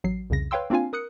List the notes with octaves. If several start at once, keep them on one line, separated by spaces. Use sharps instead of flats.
A1 F#3 C7
C2 F2 C#3 A#6
B4 C#5 F5 G5 C6 E6
A#3 C4 D4 F4 F5 G#5
A#4 D#6 F#6 C#7